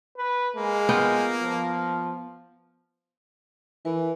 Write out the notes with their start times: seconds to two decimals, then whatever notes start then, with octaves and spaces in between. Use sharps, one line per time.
0.17 B4
0.55 G#3 A#3
0.89 B3 F4 G5
1.43 F3
3.85 E3 A#4 B4 G#5
3.99 A#4 G#5